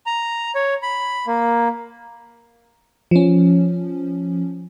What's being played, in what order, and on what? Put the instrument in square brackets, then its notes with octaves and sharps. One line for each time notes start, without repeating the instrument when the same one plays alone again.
[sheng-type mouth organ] A#5
C#5
B5
A#3
[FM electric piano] F3 C#4